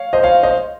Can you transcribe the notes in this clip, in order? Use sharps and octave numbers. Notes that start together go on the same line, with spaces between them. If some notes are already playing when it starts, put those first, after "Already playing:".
Already playing: C#5 F5
C5 D#5
C#5 F5
C5 D#5